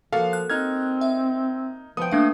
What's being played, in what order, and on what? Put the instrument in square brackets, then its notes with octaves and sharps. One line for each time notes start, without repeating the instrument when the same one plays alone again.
[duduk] F3 [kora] A#3 F#4 A4 [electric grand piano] F5
[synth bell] F#6
[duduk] C4 [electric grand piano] D#4 F6 G#6
[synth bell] E5
[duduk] F3 [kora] B3 G5 [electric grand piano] D#6
[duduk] A3 [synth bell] A#3 D4 F5